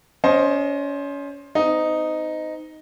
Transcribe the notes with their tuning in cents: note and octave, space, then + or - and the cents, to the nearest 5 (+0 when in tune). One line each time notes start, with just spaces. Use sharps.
C#4 +30 C5 +15 D#5 +0
C4 -35 D#4 +0